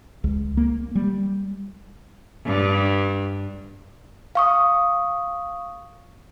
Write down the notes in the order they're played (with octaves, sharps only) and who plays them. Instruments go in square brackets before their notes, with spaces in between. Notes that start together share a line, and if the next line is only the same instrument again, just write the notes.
[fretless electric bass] C#2
A#3
G3
[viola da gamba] G2
[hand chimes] F5 C#6 D#6